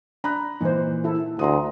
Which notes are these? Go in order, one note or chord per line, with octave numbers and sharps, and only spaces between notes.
D4 A#5 B5 F#6
A#2 E3 D#4 C5
A#3 E4 A4
D2 A#5 C6 D#6